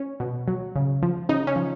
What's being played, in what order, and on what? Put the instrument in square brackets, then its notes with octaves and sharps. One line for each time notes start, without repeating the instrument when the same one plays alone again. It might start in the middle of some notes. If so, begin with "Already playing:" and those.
Already playing: [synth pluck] C#4
B2
F#3
C#3
F3
C#3 D#4
C#4
F3